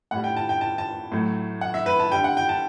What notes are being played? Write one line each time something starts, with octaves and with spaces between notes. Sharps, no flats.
A2 G3 F#5
G5
A5
G5
A5
A5
A2 F#3 A3
F#5
E5
B4
A5
D3 G3 G5
F#5
G5
A5